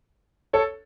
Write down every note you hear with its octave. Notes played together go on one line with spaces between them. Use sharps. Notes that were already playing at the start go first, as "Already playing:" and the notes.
A4 C#5